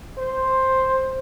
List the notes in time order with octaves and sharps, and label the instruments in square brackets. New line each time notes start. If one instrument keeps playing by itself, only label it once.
[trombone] C5